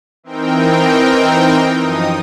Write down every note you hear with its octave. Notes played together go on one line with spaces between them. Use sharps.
E3 C4 D#4 A#4 G5
F#2 F3 D#4 D#6